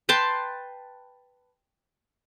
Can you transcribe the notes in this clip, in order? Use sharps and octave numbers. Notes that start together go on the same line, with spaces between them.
B4 G5 A5 C6